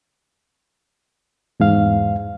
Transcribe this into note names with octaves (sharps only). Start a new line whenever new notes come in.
E2 G#2 F5